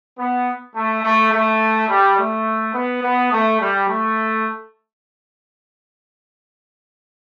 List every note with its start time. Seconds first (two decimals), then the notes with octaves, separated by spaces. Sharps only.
0.18 B3
0.76 A3
1.03 A3
1.32 A3
1.89 G3
2.18 A3
2.74 B3
3.02 B3
3.31 A3
3.60 G3
3.88 A3